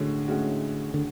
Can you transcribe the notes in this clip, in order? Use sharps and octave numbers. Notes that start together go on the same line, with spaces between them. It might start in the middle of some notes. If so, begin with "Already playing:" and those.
Already playing: A2 D3 G#3 C#4 F#4
A2 G#3 C#4 F#4
D3